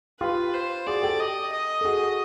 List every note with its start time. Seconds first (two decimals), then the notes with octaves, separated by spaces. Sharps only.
0.20 F4 G4 B4
0.53 C5
0.86 F#4 G#4 D5
1.03 G4 A4
1.19 D#5
1.52 D#5
1.81 A4
1.85 F#4 G#4